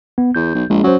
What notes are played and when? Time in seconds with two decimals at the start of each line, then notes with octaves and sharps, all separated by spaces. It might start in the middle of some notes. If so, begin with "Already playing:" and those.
0.18 B3
0.35 E2 G6
0.55 B1
0.70 A#1 G#3
0.83 F#3 C#4 C5